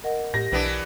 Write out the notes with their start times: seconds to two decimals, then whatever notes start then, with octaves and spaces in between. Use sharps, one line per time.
0.04 A#4 D#5 F#5
0.34 A2 G4 A#6
0.52 B1 E3 B3 D4